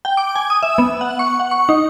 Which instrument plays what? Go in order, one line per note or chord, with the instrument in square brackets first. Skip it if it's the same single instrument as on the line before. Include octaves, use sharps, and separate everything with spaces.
[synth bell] G5
D6
G#5
D#6
E5
B3
F#5
C#6
F#5
C#6
D#4